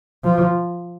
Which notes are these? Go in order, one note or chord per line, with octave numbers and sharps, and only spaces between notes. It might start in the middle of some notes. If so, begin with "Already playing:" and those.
F3